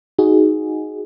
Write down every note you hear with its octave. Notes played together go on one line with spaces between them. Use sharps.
D#4 F#4 G#4